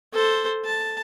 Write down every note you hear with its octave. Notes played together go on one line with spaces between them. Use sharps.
A4 C5
A5